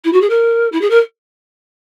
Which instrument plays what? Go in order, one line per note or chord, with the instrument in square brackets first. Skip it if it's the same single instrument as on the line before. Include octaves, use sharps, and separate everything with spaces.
[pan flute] E4
F#4
G#4
A#4
E4
G#4
A#4